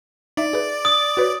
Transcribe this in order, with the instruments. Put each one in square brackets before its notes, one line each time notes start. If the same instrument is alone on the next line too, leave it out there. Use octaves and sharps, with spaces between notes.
[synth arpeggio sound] D#4 E5 [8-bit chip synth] D5
[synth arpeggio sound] G#4 B4
[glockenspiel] D#6
[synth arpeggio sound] F#4 B4 C#5